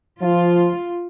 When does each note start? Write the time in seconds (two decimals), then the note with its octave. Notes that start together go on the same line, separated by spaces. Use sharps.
0.21 F3 F4